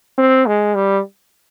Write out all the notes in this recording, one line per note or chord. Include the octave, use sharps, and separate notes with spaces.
C4
G#3
G3